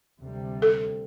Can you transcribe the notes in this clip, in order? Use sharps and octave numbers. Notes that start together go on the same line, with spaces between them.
D2 C3 G3
A4